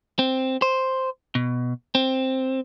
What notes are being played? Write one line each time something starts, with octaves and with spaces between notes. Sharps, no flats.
C4
C5
B2
C4